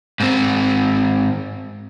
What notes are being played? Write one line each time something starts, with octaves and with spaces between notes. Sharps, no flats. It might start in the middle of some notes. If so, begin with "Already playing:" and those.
G#2 C4